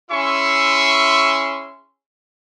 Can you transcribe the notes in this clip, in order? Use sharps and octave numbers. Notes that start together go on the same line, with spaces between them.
C#4 E4 G#4 E5 C6 C#6